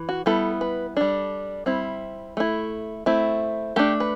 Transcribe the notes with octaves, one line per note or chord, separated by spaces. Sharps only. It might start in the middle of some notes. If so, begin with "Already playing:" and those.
Already playing: E3
F#4
G3 B3 E4 A4
B4
G3 D4 A4
G3 C4 E4
A3 E4
A3 C4 E4
A3 D4 G4
B4